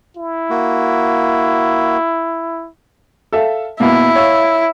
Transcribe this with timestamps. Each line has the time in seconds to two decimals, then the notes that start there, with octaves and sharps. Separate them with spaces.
0.17 E4
0.50 A#3 F#4
3.32 A4 E5 F5
3.80 B2 A#3 B3 E4
4.15 C#5 F5 E6